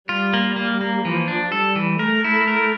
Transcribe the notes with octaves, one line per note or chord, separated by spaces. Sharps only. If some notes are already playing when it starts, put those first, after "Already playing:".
G3 F4
A#3
A#3
A#3
E3 F3
D4
G3 A4
E3
A3 A#4
E4
A#4